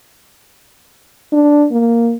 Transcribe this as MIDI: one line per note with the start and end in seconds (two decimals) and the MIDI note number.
1.32 1.67 62
1.72 2.16 58